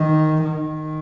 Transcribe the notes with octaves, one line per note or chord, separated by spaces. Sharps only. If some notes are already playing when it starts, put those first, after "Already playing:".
Already playing: D#3
D#3